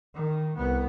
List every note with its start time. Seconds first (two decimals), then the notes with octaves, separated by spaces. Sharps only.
0.14 D#3
0.56 C2 B3